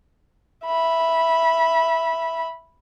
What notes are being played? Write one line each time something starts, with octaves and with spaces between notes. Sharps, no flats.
E5 B5